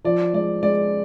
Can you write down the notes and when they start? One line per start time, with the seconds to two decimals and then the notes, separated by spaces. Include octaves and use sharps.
0.05 F3 D5
0.33 G#3 D5
0.63 G#3 D5